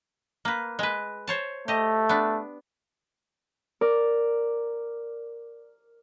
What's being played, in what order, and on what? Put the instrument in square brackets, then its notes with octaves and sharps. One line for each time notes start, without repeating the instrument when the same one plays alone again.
[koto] A#3 B4
G#3 B4
C5 C#5 A5
[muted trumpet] A3 [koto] G4 D#5
[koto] B3 D4
[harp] A#4 D5 D6